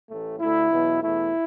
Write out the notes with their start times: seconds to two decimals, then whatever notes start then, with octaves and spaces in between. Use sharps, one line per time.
0.08 A1 A2 A3
0.39 D2 D3 A3 E4
0.71 E2 B2 F#3 B3
1.02 E2 B2 A3 E4